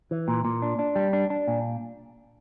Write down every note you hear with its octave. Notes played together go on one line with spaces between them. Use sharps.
E3
A#2
A#2
D4
D4
G3
D4
D4
A#2